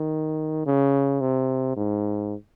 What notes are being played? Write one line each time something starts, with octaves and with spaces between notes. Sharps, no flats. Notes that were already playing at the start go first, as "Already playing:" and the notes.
Already playing: D#3
C#3
C3
G#2